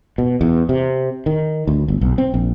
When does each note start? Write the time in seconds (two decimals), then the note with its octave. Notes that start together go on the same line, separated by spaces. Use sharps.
0.18 B2
0.41 E2
0.69 C3
1.26 D#3
1.67 D2
1.88 G1
2.01 B1
2.18 C4
2.34 A#1